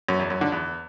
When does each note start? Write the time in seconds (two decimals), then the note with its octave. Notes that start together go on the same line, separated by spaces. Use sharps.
0.09 F#2
0.19 E2
0.30 F#2
0.41 D3
0.52 E2